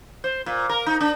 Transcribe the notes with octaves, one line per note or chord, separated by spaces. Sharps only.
C5
A#2
A#4
D#4
D4